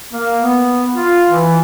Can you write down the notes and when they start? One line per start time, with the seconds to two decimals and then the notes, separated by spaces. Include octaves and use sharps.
0.13 A#3
0.39 B3
0.95 F4
1.28 E3